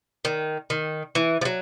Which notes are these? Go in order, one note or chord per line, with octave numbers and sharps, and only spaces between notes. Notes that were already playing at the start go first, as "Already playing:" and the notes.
D#3
D#3
E3
F3
F#3